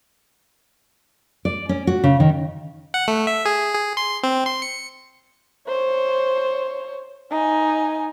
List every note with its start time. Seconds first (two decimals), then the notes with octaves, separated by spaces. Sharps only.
1.45 D5
1.69 C#4
1.87 F#4
2.04 C#3
2.20 D#3
2.94 F#5
3.08 A3
3.27 E5
3.45 G#4
3.75 G#4
3.97 C6
4.23 C4
4.46 C6
4.62 C#7
5.68 C5 C#5
7.31 D#4 G#5